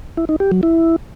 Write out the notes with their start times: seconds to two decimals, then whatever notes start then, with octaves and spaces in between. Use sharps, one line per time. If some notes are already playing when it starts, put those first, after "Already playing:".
0.17 E4
0.29 D#4
0.40 G4
0.52 F#3
0.63 E4